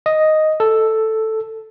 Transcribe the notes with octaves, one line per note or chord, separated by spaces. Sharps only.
D#5
A4